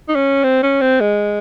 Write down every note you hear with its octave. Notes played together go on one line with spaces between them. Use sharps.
D#4
C#4
C4
C#4
C4
G#3